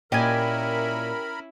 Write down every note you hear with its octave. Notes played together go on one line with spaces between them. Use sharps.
A#2 C#4 E4 G4 A#4 D#5 G#5 B5